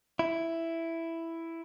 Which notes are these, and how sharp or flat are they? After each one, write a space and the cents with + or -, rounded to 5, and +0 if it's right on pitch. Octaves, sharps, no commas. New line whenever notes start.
E4 +5